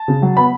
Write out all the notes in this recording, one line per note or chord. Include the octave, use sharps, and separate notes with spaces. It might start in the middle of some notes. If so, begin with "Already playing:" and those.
Already playing: A5
C#3
F#3
B3 B5